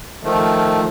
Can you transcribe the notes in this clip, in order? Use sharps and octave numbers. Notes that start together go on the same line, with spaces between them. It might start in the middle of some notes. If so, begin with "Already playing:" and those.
D#3 F3 A3